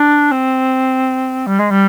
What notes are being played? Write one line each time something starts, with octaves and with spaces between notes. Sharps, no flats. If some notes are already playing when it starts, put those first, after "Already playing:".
Already playing: D4
C4
G3
G#3
G3